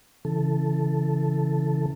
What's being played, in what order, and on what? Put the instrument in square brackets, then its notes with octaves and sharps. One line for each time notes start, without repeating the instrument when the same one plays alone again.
[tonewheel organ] C#3 E3 A4